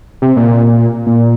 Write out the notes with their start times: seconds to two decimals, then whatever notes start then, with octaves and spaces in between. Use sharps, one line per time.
0.22 C3
0.36 A#2
1.07 A#2